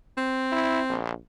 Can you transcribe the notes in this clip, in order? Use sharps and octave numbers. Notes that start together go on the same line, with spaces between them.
C4
E4
A#1